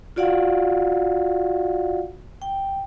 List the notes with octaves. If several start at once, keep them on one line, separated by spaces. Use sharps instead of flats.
F4 F#4 D5 F5 F#5
G5